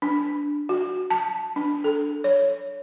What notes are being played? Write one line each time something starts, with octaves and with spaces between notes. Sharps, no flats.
D4
F#4
A5
D4
A4
C#5